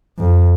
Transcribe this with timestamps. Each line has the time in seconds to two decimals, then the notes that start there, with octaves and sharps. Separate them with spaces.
0.19 F2